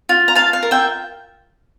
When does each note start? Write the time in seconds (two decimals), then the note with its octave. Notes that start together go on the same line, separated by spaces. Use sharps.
0.09 F4
0.28 A#5
0.35 F4 F5 A5
0.53 F5
0.63 A#4
0.71 E5 G5